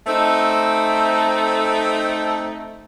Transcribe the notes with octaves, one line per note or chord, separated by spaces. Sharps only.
A3 C4 D#4 A4